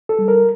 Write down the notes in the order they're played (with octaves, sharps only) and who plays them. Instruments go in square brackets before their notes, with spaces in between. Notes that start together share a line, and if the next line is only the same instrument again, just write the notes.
[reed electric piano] A4
G3
A#4